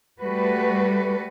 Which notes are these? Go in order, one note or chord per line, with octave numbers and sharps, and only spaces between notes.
G3 A3 F#4 B4